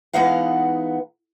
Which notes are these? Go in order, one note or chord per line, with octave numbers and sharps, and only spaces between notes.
E3 G#3 B3 D#4 F5 F#5